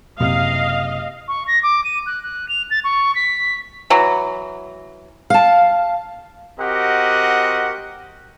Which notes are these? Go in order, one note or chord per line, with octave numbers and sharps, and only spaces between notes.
F#1 C3 D#5 F5
C#6
A#6
D6
D#7
F#6
F#6
F7
A6
C#6
B6
E3 F#3
F5 A5
C4 F#4 G4 A#4 D#5 F#5